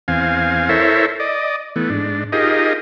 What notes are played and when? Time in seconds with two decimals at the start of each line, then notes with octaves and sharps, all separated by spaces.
0.08 E2 C4 F5 G#5
0.69 E4 A4 A#4 C5 C#5 E5
1.20 D5 D#5
1.76 E3 A3 B3
1.90 G#2 D4
2.32 D#4 F4 G4 G#4 A#4 D#5